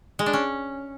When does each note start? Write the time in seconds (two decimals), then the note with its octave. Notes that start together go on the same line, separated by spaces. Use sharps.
0.19 G#3
0.26 D4
0.33 C#4